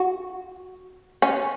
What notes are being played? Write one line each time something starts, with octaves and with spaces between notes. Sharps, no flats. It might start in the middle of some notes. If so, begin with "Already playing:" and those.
Already playing: F#4
C#4